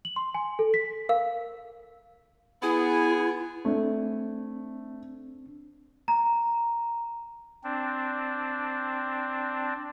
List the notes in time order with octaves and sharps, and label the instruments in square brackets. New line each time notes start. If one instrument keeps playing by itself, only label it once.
[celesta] F#7
C6
G#5
A4
B6
[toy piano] A#4 F5
[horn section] B3 G#4 [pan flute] E4
[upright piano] A3 [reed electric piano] C4 D4
[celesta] A#5
[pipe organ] C4 D4